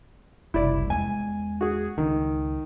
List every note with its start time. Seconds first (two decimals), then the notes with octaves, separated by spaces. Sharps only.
0.54 F#1 C2 E4 D5
0.90 E2 G#3 G#5
1.61 F#4 G#4
1.98 C#2 D#3